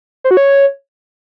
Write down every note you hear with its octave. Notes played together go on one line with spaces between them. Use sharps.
C5
F#4
C#5